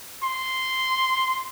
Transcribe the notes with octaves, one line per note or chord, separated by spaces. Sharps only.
C6